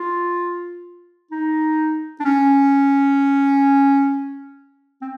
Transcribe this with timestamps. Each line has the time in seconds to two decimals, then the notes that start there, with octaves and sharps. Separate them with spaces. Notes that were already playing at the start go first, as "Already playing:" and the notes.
Already playing: F4
1.31 D#4
2.20 D4
2.25 C#4
5.02 C4